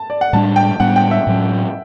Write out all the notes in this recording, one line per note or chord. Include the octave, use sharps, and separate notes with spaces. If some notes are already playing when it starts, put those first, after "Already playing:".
Already playing: A5
D5
F#5
A2 G3 B3 D4 A5
G5
A2 G3 B3 D4 F#5
G5
E5
A2 F#3 C#4